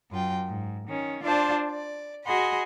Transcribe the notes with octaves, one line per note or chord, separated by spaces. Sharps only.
F#2 F4 G5
G#2
D#3 C#4
D4 F4 C5 D5 A5
D5
F#4 G#4 D#5 B5 C6